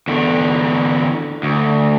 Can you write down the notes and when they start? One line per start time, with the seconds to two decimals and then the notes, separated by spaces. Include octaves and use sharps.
0.08 E2 D3
1.43 D2